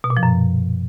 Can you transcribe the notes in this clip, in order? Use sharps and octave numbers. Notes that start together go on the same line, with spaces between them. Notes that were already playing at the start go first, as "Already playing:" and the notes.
B2
A#2
F3
F#2